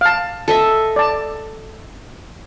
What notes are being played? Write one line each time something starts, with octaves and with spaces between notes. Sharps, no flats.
F5 A5
A4 D#5 E5
D5 A5